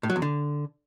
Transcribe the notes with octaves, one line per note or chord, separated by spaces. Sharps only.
A2
F#3
E2
D3